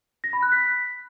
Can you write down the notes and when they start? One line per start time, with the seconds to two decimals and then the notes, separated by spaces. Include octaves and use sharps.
0.24 A#6
0.33 B5
0.43 F#6
0.52 B6